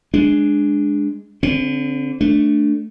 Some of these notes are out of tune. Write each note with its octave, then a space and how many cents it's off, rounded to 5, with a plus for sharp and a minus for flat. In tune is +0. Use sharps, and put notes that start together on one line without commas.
G#3 +0 D4 +0
D3 -30 C4 +0
A3 +0 D4 +0